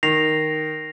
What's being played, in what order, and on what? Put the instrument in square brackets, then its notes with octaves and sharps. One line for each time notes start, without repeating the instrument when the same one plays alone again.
[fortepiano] D#3 [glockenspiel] A#6 C7 F7